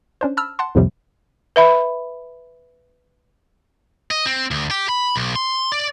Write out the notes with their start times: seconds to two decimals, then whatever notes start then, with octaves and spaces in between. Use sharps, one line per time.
0.21 C#4 D4 C5
0.37 A5 B5 E6 F6
0.59 F#5 A5 C6
0.75 C2 F2 A2 C3 F3 G3
1.56 B4 E5 B5
4.11 D#5
4.26 C4
4.51 D2
4.71 G4
4.89 B5
5.16 B1
5.36 C6
5.72 D5